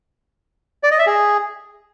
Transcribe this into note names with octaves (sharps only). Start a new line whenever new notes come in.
D5
D#5
E5
G#4